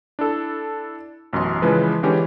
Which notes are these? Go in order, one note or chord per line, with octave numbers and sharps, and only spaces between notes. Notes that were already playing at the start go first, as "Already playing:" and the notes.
D4 E4 A4
A1 F#2 B2 C6
C#3 E3 F3 G#3 B4
D3 E3 G#3 C#4 D4 G4